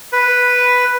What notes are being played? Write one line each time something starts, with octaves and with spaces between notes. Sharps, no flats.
B4